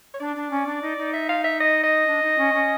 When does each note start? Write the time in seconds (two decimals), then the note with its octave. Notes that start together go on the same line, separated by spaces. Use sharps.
0.14 C#5
0.20 D4 D5
0.35 D4
0.50 C#4
0.66 D4
0.81 D#4
0.97 D#4
1.13 E5
1.29 F5
1.44 E5
1.60 D#5
1.83 D#5
2.07 D4
2.22 D#4
2.38 C#4
2.53 C#4